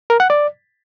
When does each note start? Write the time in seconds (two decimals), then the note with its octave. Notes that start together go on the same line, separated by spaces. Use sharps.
0.10 A#4
0.20 F#5
0.30 D5